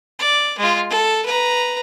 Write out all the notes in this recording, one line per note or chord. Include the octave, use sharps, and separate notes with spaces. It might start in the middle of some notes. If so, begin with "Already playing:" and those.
D5
G#3 F4
A4
B4 A#5